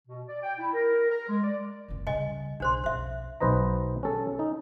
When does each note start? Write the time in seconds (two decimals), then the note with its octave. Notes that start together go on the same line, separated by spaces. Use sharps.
0.08 B2
0.27 D5
0.42 G5
0.59 E4
0.73 A#4
1.10 A#4
1.28 G#3
1.43 D5
1.88 F#1 C#2
2.07 C#3 G3 D#5 G#5
2.60 B1 D4 C5 C6
2.84 B1 F2 C5 E5
3.40 B1 B4 C5 D#5 A#5
4.03 C#4 A4
4.39 D#4